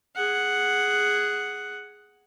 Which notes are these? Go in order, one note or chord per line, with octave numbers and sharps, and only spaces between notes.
G#4 F#5